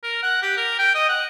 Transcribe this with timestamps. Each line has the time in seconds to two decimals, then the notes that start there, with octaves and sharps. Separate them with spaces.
0.03 A#4
0.23 F#5
0.42 G4
0.57 A#4
0.79 G5
0.95 D#5
1.09 F#5